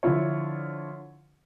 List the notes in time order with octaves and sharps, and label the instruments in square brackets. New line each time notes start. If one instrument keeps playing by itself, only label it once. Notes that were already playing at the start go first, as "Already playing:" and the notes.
[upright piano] D3 F3 E4 F4 C#5